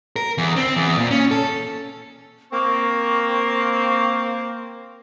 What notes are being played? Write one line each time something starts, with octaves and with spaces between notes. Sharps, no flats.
A#4
E2
C4
E2
A#2
C#4
A4
A#3 C4 C#6